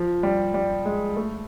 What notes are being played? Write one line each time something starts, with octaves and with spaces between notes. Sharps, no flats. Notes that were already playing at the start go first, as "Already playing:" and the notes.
Already playing: F3
G3
G3
G#3
A3